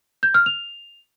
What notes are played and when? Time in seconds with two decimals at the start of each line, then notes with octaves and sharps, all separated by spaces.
0.23 G6
0.34 F6
0.46 F7